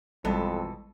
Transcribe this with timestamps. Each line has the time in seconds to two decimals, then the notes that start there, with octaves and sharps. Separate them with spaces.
0.25 A1 F2 B2 E3 G3 G#3 A4